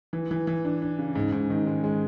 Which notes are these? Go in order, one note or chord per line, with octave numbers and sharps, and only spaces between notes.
E3
E3
E3
D4
D4
C#3
G#2
G#2
D#3
G#3
G#3